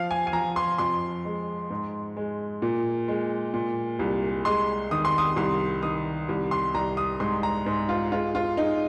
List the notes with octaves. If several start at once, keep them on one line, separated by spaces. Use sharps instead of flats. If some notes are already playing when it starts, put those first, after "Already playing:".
Already playing: F3 F5
G#5
G#5
F3 A#5
C6
F2 C6
G#3
G#2
G#3
A#2
G#3
A#2
C2
G#3 C6
D#3 D#6
C6
D#6
C2 C6
D#3 D#6
C2
C6
C2 A#5
D#6
G#2 C6
A#5
G#2
F4
G#3 F4
F4
G#3 D#4